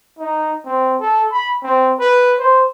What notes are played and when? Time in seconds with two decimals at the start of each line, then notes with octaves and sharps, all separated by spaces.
0.19 D#4
0.65 C4
1.00 A4
1.32 B5
1.63 C4
2.00 B4
2.39 C5